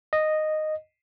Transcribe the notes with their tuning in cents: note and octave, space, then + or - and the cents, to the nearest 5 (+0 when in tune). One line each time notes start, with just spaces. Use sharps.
D#5 -10